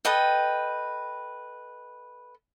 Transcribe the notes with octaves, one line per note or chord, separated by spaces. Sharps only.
A4 B4 D#5 G5